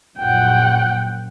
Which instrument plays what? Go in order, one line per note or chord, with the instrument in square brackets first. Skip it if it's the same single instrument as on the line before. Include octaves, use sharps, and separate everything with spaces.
[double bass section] A#1 F#2 [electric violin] F#5 G5